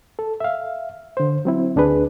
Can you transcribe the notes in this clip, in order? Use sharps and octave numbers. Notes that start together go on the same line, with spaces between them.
A4
E5 F5
D3 C5
F#3 C4 E4
D2 D4 G#4 B4